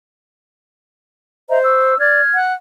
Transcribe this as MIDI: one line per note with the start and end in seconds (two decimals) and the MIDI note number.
1.50 1.98 72
1.50 1.59 75
1.50 1.59 76
1.50 1.59 82
1.63 1.97 85
1.63 1.97 88
1.99 2.21 74
1.99 2.36 89
1.99 2.36 92
2.34 2.54 78